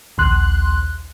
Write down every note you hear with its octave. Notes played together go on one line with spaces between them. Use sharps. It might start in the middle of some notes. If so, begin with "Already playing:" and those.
A#1 D#2 C6 F#6